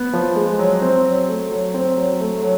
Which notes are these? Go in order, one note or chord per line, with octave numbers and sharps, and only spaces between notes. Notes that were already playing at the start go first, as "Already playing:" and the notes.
Already playing: B3
F3
G#3
F#3
C4
F#3
A3
F#3
C4
F#3
A3
F#3